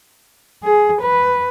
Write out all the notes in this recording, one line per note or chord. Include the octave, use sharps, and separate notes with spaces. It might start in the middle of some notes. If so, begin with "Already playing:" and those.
G#4
B4